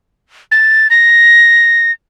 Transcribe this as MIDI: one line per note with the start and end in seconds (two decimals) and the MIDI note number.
0.52 0.88 93
0.90 1.91 94